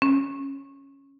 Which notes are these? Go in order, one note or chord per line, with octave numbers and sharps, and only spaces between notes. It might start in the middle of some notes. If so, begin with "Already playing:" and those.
C#4